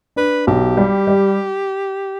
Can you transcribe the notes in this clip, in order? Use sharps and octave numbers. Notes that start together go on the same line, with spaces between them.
D4 B4
B1 G4
G3
G3